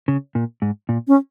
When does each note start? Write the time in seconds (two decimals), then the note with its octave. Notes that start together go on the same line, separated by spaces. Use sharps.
0.08 C#3
0.35 A#2
0.62 G#2
0.89 A#2
1.08 C#4